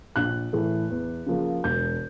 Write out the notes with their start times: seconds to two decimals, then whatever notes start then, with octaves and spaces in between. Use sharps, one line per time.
0.16 A#1 F#6
0.53 A2 E3 A3
0.90 E2
1.26 C#3 F3 A#3
1.64 E1 G6